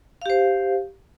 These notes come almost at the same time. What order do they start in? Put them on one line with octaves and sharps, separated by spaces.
F5 G4 C5